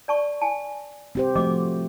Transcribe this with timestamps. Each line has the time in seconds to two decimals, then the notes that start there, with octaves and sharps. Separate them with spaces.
0.08 D5 A5 C#6
0.42 G#5 A5
1.15 C4 G4 C5
1.35 F3 A3 F#4 D#5 D6